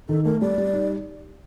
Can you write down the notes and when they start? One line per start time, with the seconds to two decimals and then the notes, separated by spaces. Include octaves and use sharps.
0.09 D#3 A4
0.25 A3 A#4
0.41 G3 D5
0.58 G3
0.73 D#4